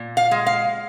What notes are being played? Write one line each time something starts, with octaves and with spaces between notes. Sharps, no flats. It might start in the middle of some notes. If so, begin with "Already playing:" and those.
Already playing: A#2
F5
G#3
F5